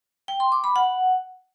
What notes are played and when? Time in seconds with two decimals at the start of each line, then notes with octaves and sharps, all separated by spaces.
0.28 G5
0.40 C6
0.52 D6
0.64 B5
0.76 F#5